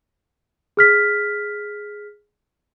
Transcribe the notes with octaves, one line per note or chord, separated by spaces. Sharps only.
G#4 F6 B6